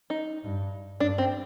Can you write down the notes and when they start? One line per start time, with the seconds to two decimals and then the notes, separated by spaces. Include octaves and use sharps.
0.10 D#4
0.44 G2
1.00 G2 D4
1.18 C4